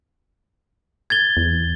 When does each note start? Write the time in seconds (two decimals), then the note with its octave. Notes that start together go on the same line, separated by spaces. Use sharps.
1.10 G#6 A6 G7
1.37 E2